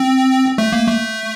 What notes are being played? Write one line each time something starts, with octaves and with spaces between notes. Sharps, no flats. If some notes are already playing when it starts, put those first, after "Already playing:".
Already playing: C4
A3
A#3
A3